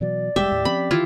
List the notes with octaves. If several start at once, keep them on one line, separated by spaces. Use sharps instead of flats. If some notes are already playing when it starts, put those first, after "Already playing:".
B2 E3 F#3 D5
E1 G3 G#3 G4 E5
D#2 A2
F3 C4 C#4 B5
D#3 E3 E4 F4